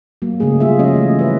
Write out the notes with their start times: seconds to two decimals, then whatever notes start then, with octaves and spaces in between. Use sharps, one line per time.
0.22 F#3 A#3
0.40 C#3 G#3 A3 G#4
0.60 G3 F4 G#4 E5
0.79 F3 F#3 C#4 D#5
0.95 E3 A3
1.19 B4 E5